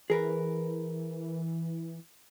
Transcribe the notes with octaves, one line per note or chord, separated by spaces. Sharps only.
E3 G#4 A#4 B4